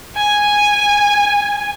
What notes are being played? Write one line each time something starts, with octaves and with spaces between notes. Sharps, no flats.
G#5